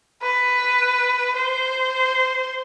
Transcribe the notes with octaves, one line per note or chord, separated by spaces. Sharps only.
B4
C5